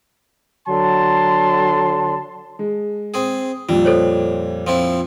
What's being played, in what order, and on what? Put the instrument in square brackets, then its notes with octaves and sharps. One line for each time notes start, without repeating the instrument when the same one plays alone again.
[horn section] D3 F#3 A5 C6
[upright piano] G#3
[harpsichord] C4 G#4
[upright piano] F2 A#2 [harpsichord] G3
[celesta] A4 C5 C#5
[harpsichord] F3 C4 E4